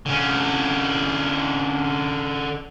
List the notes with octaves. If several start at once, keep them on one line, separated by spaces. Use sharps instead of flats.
D3 C#4